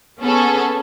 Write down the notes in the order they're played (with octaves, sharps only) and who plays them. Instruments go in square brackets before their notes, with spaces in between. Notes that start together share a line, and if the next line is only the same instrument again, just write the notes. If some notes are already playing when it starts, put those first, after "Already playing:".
[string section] B3 C#4 G#4 A4